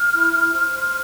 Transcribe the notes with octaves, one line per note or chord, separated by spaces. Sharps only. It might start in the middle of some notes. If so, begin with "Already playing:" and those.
Already playing: F6
E4
E4
C5
C5